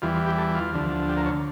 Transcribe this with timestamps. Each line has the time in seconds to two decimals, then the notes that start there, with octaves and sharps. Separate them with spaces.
0.02 E2 E3 G3 F4
0.14 F4
0.26 G4
0.38 A4
0.55 F4
0.73 D2 D3 F3
1.09 G4
1.17 A#4
1.26 C#5